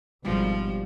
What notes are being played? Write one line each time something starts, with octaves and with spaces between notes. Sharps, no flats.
G#1 B2 F3 G3